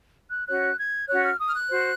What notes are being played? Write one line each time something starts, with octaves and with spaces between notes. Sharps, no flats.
F#6
C#4 F#4 C#5 F#6
G#6
C#4 F#4 C#5 F#6
F6
D#6
F6
F#6
F#4 C5